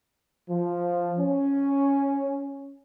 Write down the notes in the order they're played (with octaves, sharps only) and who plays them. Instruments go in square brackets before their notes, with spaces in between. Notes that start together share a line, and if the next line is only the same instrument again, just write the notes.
[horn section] F3
C#4